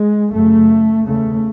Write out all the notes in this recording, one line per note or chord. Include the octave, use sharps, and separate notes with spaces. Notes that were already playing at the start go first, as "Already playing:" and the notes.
Already playing: G#3
F#2 C#3 A3
E2 C#3 A3